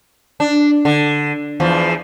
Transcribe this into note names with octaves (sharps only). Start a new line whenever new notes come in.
D4
D3
E2 F3